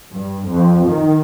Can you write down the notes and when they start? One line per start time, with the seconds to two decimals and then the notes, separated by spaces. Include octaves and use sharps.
0.13 G2
0.48 F2
0.87 D#3